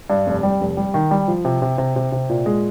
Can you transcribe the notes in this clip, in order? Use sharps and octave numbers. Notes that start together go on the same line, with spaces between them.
G2
F1
G3
F1
G3
D#3
G3
F3
C3
C3
C3
C3
C3
A#2
G#3